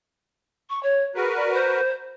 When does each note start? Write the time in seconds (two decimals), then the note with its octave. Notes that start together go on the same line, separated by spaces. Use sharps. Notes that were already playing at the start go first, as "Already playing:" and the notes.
0.70 C#6
0.83 C#5
1.15 F#4 G#4 A#4 B4
1.36 D5
1.54 C5